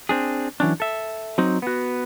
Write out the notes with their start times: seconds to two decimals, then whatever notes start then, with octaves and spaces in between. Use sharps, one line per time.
0.09 C4 D4 G#4
0.60 E3 F#3 C#4 D4
0.80 A4 E5
1.38 F#3 C4 D#4
1.62 B3 F#4